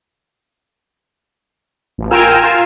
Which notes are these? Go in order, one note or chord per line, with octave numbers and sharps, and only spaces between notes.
A1
F4 A#4 G5 G#5 E6 F6
F4